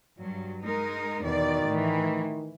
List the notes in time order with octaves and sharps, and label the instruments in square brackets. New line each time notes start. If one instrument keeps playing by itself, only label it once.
[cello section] G2 F#3
G#3 D#4 A#4
[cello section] E2 B2 D5 [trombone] D#3
[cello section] A2 E3